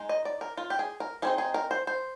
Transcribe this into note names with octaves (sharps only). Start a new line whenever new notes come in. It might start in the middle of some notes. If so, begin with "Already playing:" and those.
Already playing: G#3 D#4
D#5
D5
A#4
F4
G4
G#4
A#4
G3 C4 D#4 G#4
G#4
A#4
C5
C5